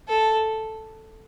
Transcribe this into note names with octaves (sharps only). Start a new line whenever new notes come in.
A4